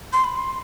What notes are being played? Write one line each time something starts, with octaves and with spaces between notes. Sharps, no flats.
C6
B5
C6